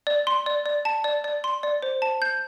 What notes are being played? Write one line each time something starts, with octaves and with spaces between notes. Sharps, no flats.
D5
C6
D5
D5
A5
D5
D5
C6
D5
C5
A5
G6